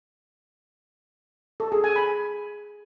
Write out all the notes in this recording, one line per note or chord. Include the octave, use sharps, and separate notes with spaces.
A4
G#4
G#5
B5